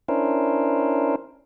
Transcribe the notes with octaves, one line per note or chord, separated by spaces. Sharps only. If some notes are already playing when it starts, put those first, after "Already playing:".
C#4 D4 E4 A#4 C5